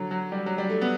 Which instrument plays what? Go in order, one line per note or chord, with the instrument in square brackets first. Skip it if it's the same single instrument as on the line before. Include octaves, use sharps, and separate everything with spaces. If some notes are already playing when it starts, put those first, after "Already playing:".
Already playing: [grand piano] D3 F#3
F#3
G3
F#3
G3
A3
B3